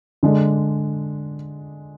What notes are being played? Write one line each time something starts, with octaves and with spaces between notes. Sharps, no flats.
D3 G#3 D4